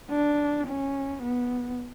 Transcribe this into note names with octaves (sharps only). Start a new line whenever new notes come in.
D4
C#4
B3